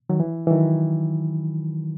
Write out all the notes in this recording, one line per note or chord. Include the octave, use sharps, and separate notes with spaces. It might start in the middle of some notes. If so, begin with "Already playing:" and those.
D#3 F#3
E3
E3
D#3 F#3